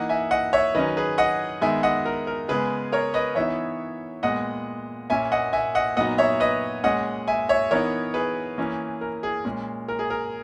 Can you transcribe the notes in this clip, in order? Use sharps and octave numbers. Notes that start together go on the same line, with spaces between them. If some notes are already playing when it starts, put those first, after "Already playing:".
Already playing: E3 A#3 D#4 D#5 F#5
E5 G#5
D#5 F#5
C#5 E5
D#3 F#3 C#4 B4 D#5
G#4 B4
D#5 F#5
D#3 G#3 B3 E5 G#5
D#5 F#5
A#4
A#4
C#3 G#3 B3 G#4 B4
A#4 C#5
B4 D#5
E3 B3 D#4 C#5 E5
A#2 G#3 B3 D#5 F#5
A#2 A#3 C#4 E5 G#5
D#5 F#5
E5 G#5
D#5 F#5
A#2 F#3 B3 D#4 D#5 F#5
C#5 E5
B4 D#5
A#2 G#3 C#4 D#5 F#5
E5 G#5
C#5 E5
E3 B3 D#4 A#4 C#5
G#4 B4
E3 A#3 C#4
A#4
G#4
A#2 G#3 C#4
A#4
G#4
A#4